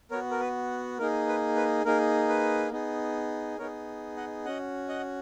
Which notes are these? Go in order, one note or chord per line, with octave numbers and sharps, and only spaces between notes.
B3 F#4 A#4 C#5
A#4
B4
A#3 D#4 G#4 A#4
B4
B4
A#3 D#4 G#4 A#4
B4
B3 D#4 G#4
B3 D#4 G#4 A#4 C#5
D#5 F#5
C#4 F#4 D#5 F#5
D#5 F#5